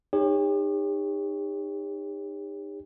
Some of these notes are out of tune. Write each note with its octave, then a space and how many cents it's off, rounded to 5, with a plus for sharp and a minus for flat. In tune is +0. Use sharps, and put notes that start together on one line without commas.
D#4 -20 G4 +40 C#5 +0